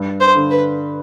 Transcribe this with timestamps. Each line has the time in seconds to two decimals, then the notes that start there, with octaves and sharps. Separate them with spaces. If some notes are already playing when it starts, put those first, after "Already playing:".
Already playing: G2
0.21 C5
0.35 D3
0.51 B4